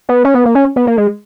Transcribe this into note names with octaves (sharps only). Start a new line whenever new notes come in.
B3
C#4
B3
A#3
C#4
B3
A#3
G#3